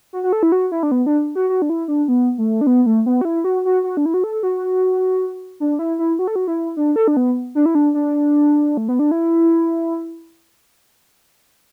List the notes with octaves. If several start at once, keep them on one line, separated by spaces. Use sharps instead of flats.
F#4
F#4
A4
E4
F#4
E4
D4
B3
D4
F#4
F#4
D4
E4
D4
B3
A3
D4
B3
A3
B3
F#4
E4
F#4
F#4
F#4
D4
E4
F#4
A4
F#4
D4
E4
E4
F#4
A4
F#4
E4
D4
A4
D4
B3
D4
E4
D4
D4
A3
B3
D4
E4